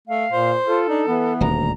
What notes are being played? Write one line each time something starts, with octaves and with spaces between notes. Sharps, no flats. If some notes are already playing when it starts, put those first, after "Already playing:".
A3 F5
A#2 C5
F4 A4
D4 D#4
E3 B3
D#1 D2 A#5